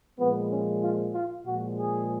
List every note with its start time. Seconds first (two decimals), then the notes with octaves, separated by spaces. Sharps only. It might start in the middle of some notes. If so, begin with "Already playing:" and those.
0.18 A#2 F3 G#3 B3
0.50 C#4
0.82 F4
1.13 F4
1.45 A#2 F3 G#3 F#4
1.77 G#4